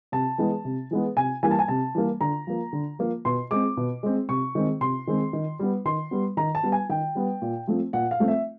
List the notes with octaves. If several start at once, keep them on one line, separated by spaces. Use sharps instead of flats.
C3 A5
E3 G#3 B3
C3
E3 G#3 B3
C3 G#5
E3 G3 A#3 G#5
A5
G#5
C3 A5
E3 G3 A#3
D3 A#5
F3 A#3
D3
F3 A#3
B2 C6
G#3 C4 D6
B2
G#3 C4
C3 C#6
D#3 G#3 C4
C3 C6
D#3 G#3 C4
D#3
G3 B3
D#3 C6
G3 B3
D#3 A#5
A5
G3 B3
G#5
D#3 G5
G3 B3
A#2
F3 A3 C4
A#2 F#5
F5
F3 A3 C4
E5